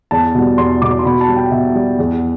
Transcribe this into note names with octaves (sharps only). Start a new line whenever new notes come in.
E2 A5
B2 G3
E2 C6
B2 G3 D6
C6
B2 B5
A5
G3
G5
B2 E5
G3
E2